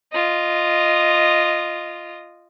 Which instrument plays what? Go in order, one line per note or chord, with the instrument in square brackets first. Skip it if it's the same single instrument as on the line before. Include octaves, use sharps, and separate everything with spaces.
[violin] F4 D#5